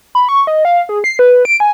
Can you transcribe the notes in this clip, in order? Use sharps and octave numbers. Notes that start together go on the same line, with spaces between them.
B5
C#6
D#5
F5
G#4
C7
B4
D7
G#5